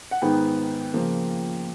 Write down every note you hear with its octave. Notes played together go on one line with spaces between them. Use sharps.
F#5
G#2 D#3 G#3 B3 G5
C#3 F3 A#3